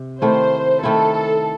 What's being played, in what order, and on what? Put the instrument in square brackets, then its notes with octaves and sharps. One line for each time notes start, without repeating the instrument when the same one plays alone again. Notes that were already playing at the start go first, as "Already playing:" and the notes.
Already playing: [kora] C3
[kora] D#3 A3 C4 E4 [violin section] C5
[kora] D#3 A3 C4 E4 [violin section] A4